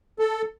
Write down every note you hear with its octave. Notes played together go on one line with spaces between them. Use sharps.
A4